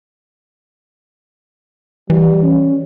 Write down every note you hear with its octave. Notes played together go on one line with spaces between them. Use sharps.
E3 G3
C#4